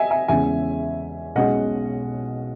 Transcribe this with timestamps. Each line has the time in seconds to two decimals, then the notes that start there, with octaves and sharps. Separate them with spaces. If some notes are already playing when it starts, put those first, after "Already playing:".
Already playing: D#5 E5 G#5
0.11 E5 G#5
0.28 E2 C#3 G#3 C#4 E5 G#5
1.35 B1 B2 G#3 C#4 D#5 F#5